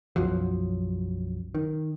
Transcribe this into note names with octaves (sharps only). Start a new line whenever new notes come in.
B1 F#2 F3 F#3
D#3